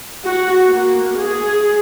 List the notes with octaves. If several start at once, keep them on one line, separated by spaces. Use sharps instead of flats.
F#4
A#3
G#4